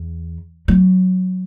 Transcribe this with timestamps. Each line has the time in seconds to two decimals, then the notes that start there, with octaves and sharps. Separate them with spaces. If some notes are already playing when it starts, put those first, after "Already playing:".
Already playing: E2
0.68 F#3